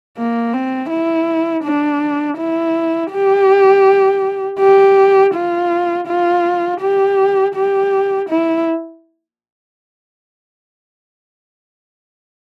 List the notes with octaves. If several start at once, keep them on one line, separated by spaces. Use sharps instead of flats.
A#3
C4
E4
D4
E4
G4
G4
F4
F4
G4
G4
E4